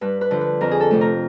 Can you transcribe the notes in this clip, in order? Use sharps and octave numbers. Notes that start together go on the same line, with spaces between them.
G2 B4
B4
D3 F3
B4
F2 A#4
G#4
A4
C3 F3 A3
A#4